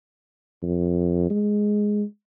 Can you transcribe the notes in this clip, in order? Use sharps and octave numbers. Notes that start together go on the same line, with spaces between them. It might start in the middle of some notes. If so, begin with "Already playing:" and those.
F2
G#3